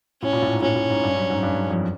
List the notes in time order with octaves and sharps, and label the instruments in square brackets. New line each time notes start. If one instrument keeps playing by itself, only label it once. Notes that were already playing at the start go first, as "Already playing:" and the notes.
[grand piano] A2 [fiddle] C#4
[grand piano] A#2
A2
G#2
[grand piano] A2 [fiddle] C#4
[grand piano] A2
G#2
G2
F#2
G#2
G2
F#2
F2